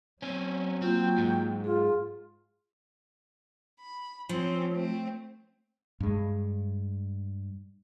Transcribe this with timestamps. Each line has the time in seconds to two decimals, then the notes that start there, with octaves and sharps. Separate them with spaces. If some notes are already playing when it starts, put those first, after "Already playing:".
0.22 F#3 C4 C#4
0.82 A#3 C4 F4 G5
1.18 G#2
1.64 F4 G#4
3.80 B5
4.29 F3 C4 C#4
4.71 A3 C4
6.00 G2 G#3